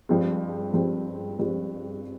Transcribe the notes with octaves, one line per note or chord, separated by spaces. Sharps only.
G2 F3 G#3 C4
G2 F3 G#3 C4
G2 F3 G#3 C4